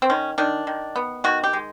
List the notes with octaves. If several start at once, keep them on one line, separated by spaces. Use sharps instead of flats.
C4
D#3 C#4
D#3 D4
D#3
B3
D#3 F#4
G4
G#3